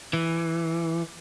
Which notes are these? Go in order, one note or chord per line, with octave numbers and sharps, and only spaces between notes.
E3